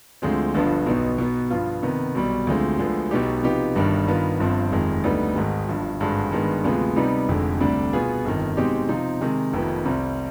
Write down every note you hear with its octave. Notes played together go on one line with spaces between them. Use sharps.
D2 D3 F3 G#3 C4
G1 G2 D3 F3 B3
B1 B2 B3 D#4
B2 B3 D#4
G2 F3 B3 F4
C3 D#3 B3
B1 B2 G3
D2 D3 F3 G#3 C4
D2 D3 F3 G#3 B3
B1 B2 B3 D#4 G4
C3 F3 B3 D#4 G4
G1 G2 D#3 G3 D4
G2 D#3 B3 F4
G1 G2 F3 C4
F1 F2 D#3 G#3
D2 D3 G3 B3 D#4
G#1 G#2 D#3 G#3
G1 G2 F3
G#1 G2 D3 G#3
G2 D#3 G#3 B3
D2 C3 F3 G#3 B3
C3 G3 B3 D#4 G4
F1 F2 D3 G#3
D2 C3 G3 D4
B2 B3 F4 G#4
G1 F2 D#3
B2 G#3 C4 D#4 G4
C3 F3 C4 D#4
C3 D#3 G#3
F1 F2 C3 D#3 B3
C2 C3 G3 C4